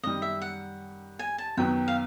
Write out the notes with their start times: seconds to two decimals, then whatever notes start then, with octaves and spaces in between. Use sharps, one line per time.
0.03 F#2 D#3 G3 D#5
0.22 E5
0.41 F#5
1.19 G#5
1.38 A5
1.57 F#2 D#3 F#3 B3 G5
1.88 F5